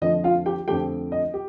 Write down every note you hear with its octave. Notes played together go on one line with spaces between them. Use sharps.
F2 D3 F3 A3 D#5
F4 F5
G4 G5
F2 D3 F3 A3 G4 G5
D#5
G4